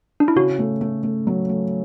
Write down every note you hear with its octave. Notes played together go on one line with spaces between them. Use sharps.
D4
E4
C#3 F#4
A3
A3
A3
F#3
A3